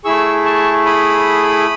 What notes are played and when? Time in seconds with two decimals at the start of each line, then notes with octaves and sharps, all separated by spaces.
0.05 A3 E4 G#4 C#6 E6
0.45 A5 C#6
0.86 B5 D#6